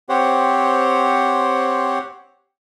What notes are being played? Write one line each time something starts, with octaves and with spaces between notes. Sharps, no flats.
C4 G4 C5 C#5 F#5